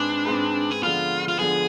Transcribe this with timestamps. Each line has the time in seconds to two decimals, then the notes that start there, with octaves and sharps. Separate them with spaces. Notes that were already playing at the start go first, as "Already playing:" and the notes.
Already playing: G#2 G#3 C4 D4 G#4 B4
0.25 G#2 G#3 C4 G#4 B4
0.71 G#4
0.82 D3 F3 G#3 B3 F4
1.28 F4
1.38 D3 F3 G#3 B3 G#4